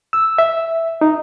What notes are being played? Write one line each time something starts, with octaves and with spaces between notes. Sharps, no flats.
E6
E5
D#4